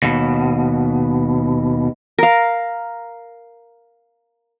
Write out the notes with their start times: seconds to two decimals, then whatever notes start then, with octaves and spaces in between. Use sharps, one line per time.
0.03 D#2 B2
2.19 A#4 F5